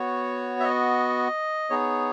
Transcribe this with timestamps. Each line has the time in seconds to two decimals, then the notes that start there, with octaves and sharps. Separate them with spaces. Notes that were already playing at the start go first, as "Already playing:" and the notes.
Already playing: B3 F#4 C#5
0.60 E5
0.64 D#5
1.70 B3 D#4 G#4 C#5